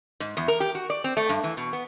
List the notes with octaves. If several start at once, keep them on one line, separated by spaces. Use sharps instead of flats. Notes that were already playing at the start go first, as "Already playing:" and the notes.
G#2
E2
A#4
G4
F#4
D5
C4
A3
G2
E3
B2
B3